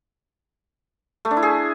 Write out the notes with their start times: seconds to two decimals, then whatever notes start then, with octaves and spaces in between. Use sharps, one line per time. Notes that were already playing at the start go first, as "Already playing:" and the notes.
1.25 A3
1.31 D4
1.37 E4
1.43 G#4